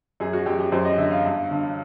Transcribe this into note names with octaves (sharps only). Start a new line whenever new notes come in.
F#2 G#4
F#4
F#2 G4
G4
F#2 C5
D#5
D3 E5
F5
G2
D3